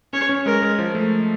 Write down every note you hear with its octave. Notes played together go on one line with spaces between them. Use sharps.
C#4 C#5
C#4
G#3 A#4
G#3
F3
A3